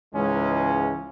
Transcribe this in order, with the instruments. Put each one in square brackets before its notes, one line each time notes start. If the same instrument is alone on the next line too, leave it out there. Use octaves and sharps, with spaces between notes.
[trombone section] C#2 G#2 E3 G#3 C#4